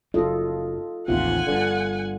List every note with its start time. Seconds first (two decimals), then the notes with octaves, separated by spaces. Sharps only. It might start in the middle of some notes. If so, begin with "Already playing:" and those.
0.14 F#1 F#2 F4 A4 D#5
1.08 A1 D#2 C3 F4 F#5 G#5
1.47 G1 G2 D3